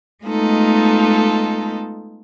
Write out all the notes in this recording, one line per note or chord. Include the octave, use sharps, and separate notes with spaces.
G#3 A3 B3 D#4 F4 A4